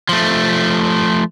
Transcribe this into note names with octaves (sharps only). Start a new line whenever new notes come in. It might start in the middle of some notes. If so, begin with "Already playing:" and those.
F3 A3